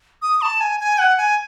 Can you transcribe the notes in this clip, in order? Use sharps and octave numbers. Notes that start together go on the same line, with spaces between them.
D#6
A5
G#5
G#5
F#5
G#5